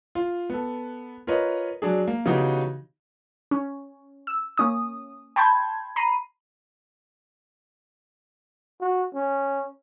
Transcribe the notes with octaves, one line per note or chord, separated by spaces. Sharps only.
F4
B3 A4
F4 A#4 B4 C#5 D#5
F#3 D4 G#4
A#3
C#3 E3 B3 D#4 F#4 G4
C#4
E6
A#3 C#4 D#6
G5 A5 B5 C6 G6 G#6
A#5 B5 C7 D#7
F#4
C#4